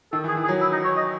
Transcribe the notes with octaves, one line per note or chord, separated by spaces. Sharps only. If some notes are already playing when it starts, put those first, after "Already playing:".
D#3 A4
E3
G#4
E3
G#4
F#3
E4
D#4
C#5
D#5